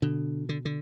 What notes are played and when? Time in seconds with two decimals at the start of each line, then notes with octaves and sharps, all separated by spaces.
0.02 B2 D3
0.49 D3
0.65 D3